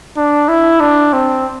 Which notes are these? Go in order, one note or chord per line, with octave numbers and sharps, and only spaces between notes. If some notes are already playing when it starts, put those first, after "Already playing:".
D4
E4
D4
C4